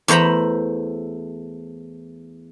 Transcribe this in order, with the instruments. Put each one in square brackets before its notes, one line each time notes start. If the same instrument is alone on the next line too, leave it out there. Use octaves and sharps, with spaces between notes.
[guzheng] E2 A3 C5 A#5 B5